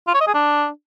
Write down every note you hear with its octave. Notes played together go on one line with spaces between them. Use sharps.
F4
C#5
D#5
G#4
D4